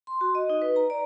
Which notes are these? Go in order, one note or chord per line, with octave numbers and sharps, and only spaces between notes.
C6
F#4
D#5
D#4
B4
A#5
D5